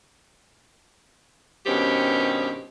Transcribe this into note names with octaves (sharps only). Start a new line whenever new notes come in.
G2 B2 D#3 C4 C#4 G4